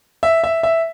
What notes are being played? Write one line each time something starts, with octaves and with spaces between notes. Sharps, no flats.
E5
E5
E5